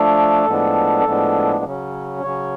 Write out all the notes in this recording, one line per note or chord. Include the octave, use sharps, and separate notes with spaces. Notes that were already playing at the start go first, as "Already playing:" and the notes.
Already playing: F3 A3 D4 A4
A2 F3 G#3 B3 D4
A2 F3 G#3 B3 D4
C#3 F#3 C#4
C#3 F#3 C#4 C#5